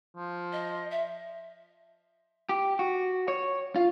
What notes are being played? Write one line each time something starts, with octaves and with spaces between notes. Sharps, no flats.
F3
D#5
E5
G4
F#4
C#5
F4